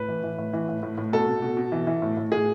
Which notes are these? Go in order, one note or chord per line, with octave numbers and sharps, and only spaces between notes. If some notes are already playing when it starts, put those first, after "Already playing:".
Already playing: A2 B4
E3
E3
A2
E3
A2
A2
A2
B2 A4
B2
B2
B2
E3
E3
A2
A2
A2 G#4